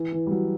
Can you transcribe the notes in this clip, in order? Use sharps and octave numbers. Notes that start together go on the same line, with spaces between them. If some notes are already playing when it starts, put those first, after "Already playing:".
Already playing: E3
E3
G3
F#3